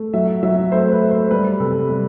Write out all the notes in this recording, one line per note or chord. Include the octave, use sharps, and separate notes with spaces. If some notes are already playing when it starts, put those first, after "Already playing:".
Already playing: A3
F#3 E5
F#3 E5
A3 C5
B4
A3
C5
G3 B4
C3 A4
G3